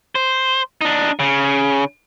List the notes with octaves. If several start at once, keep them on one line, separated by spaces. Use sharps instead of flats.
C5
D4 D#4
C#3